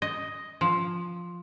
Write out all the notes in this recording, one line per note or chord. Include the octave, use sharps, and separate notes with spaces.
D#5
F3